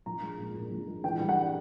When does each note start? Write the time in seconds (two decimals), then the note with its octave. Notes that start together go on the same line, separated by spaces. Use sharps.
0.06 F3 A#5
0.22 G#3
0.39 A#2
0.55 A#2
0.71 F3
0.87 G#3
1.04 E3 G5
1.20 G3
1.29 F#5